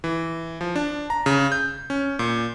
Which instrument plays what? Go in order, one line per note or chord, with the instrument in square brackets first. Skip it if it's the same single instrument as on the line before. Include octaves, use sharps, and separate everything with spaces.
[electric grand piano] E3
F3
D4
A#5
C#3
G6
C#4
A#2